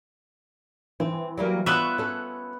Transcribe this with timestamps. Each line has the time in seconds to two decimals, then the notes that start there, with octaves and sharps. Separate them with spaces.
1.00 E3 C4
1.38 F#3 G3 A#3
1.66 B3 F4 C#5 E5 C#6 F#6
1.98 C#4 A4